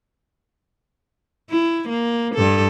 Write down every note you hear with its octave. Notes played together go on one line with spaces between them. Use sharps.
E4
A#3
G2 A4